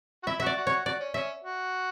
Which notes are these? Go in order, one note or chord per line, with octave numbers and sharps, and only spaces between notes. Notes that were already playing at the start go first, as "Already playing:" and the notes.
F#4
E4 E5
F#4 E5
D5
F#4
F#4 C#5
F#4 D5
C#4
C#4 E5
F#4